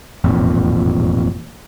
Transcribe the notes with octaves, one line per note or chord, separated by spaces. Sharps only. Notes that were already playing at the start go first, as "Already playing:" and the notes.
E1 A1 F2 A#2